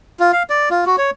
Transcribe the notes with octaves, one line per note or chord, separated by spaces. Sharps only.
F4
F5
D5
F4
F#4
C#5